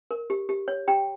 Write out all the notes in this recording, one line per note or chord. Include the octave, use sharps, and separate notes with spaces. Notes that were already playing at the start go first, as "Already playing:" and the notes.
A#4
G4
G4
C#5
G4 G5 A#5